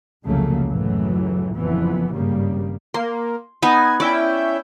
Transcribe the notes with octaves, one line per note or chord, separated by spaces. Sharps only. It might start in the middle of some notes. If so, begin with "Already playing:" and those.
F1 C#2 C#3 F#3 A3 A#3
C#2 F#2 A2 E3 F#3 A3
F#1 F2 E3 F3 B3
G#1 G2 C#3 G3 A#3
A#3 C6
B3 D#4 B4 G#5
C#4 E4 D5 G5